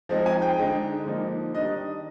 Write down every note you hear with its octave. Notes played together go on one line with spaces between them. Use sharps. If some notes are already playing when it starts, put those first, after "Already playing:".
F3 G#3 C4 D#4
G#5
G5
D3 G#3 D#4
D3 F3 A#3 D#4
D#3 G3 D4 D#5